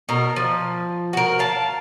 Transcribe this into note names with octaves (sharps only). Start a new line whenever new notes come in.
B2 A#4
F3
F#4 A#4
F5 A5